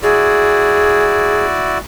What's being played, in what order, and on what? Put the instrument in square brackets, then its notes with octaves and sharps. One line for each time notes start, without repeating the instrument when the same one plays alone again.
[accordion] E4 F#4 D5 [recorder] G#4